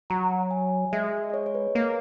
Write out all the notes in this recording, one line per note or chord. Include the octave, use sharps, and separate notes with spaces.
F#3 A#5
G#5
G#3 E5
D#5
C#5
C#5
B4
A#3 A#4